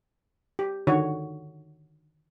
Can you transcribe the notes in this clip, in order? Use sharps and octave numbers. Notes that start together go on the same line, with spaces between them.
G4
D3 D#3 F#4 C#5